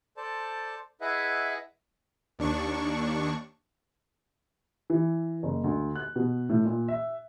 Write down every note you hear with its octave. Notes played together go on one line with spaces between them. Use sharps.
A4 C5 D5 A5
E4 G#4 B4 D#5 E5 F#5
D#2 D4 C#6
E3
F#1
D2
F#6
B2
A2
A#2
E5